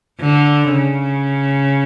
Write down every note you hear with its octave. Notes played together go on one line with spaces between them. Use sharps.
D3
C#3